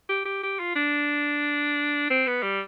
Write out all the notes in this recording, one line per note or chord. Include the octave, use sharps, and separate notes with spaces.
G4
G4
G4
F4
D4
C4
B3
G3